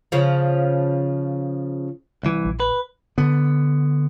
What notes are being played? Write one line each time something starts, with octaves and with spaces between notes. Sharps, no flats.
C#3 F3
C2 E3
A#1
B4
D3 B3